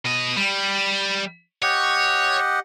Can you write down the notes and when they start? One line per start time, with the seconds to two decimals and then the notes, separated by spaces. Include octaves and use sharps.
0.05 B2 D#5
0.36 G3 B5
1.62 G4 C#5 D#5 F#5